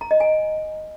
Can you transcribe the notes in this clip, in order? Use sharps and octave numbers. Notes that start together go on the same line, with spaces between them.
A#5
D#5
G#5